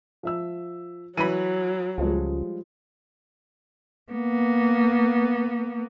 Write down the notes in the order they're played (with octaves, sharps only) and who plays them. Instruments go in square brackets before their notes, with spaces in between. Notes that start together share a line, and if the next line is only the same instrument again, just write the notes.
[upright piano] F3 E5 E6
[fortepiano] E3 B5 [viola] F#3 [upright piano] D#7
[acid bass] C#2 [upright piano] F3 G3 G#3
[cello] A#3 B3